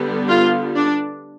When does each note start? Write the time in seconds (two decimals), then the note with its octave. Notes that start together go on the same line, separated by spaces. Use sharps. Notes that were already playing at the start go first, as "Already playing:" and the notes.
Already playing: D3 G3 B3
0.28 F4
0.75 D4